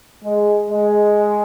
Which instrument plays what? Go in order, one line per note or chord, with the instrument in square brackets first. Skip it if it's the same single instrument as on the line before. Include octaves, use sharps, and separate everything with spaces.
[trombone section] G#3
G#3